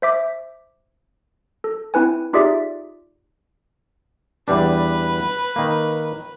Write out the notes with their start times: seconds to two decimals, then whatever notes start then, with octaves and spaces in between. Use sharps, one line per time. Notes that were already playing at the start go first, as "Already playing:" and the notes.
0.02 C5 E5 D6
1.64 A4
1.94 C4 E4 B4 G#5
2.33 D#4 F4 G4 G#4 D5 E5
4.48 E2 G3 D4 B4
5.56 D#3 A#3